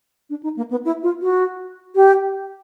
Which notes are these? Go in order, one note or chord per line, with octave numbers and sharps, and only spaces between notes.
D4
D#4
A#3
B3
E4
F4
F#4
G4